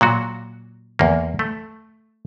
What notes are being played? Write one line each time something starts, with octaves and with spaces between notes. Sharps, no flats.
A#2 F#3 F#4
E2 A#3
A3